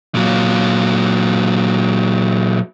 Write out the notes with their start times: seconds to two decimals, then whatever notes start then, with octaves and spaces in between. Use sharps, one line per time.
0.15 A#2 F#3